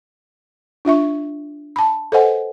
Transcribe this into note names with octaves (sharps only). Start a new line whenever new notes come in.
D4 F4 E5 C#6
A5 B5
A4 B4 C5 D#5 F#5 G#5